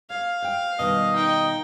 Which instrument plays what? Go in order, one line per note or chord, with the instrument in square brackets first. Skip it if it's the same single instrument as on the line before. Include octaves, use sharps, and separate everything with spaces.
[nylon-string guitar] C#5 [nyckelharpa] F5
[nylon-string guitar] C5 G5
[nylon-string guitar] B2 D#3 G3 [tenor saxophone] D#5
[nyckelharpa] D#4 G5